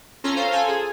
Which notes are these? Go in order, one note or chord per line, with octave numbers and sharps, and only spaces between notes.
C#4 F4 A4 A#5 C6
C5 F5
F4 A4 G#5
G#4